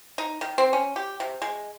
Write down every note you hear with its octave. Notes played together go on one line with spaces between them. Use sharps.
D#4
D#3
C4
C#4
G4
C3
G#3